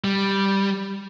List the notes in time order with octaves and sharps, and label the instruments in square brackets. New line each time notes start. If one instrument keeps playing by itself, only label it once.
[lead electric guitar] G3